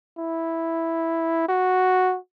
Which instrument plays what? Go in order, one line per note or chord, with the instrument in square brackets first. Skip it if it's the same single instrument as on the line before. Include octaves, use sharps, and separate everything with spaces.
[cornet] E4
F#4